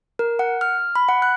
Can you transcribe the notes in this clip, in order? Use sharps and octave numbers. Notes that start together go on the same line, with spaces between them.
A#4
F#5
F6
B5
F#5
F#6